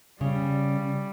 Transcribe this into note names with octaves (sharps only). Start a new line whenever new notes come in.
C#3 G3